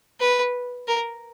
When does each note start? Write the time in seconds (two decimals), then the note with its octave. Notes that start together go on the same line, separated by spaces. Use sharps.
0.20 B4
0.87 A#4